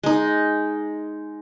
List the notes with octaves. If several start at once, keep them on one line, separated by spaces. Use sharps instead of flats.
G#3 D#4